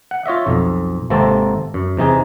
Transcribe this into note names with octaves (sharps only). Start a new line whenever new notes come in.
F#5
F4 C#5 D#5 E5
B1 F2
G#1 C3 A#3 C4 A4 A5
F#2
E2 C3 D#4 G#4